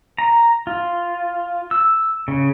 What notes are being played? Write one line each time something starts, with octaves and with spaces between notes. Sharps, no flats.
A#5
F4
E6
C#3